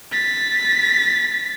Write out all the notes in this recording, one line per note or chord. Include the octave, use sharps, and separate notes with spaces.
A6 B6